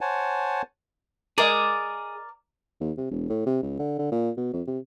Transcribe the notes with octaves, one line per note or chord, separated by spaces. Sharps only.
C5 C#5 F#5 G#5 A5
G#4 A#4 D5 D#5
D#2
C3
E1
A2
C3
C#2
D3
D3
A#2
B2
F2
C3